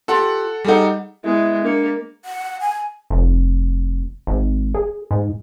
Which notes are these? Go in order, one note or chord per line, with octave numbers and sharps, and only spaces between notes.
F4 G4 A4 F#5
G3 D#4 G#4 A4 F#5
G#3 B3 E4 E5
A#3 D4 C#7
F#5
G#5
F1
G#1
G#4
G#2